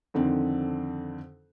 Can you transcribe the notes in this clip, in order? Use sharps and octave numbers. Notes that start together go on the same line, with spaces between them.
F2 D3 D#3 C4